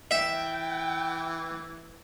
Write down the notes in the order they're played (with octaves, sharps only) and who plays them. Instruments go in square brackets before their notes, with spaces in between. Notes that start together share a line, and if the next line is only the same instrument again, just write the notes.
[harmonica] E3 [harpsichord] E5 [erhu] G5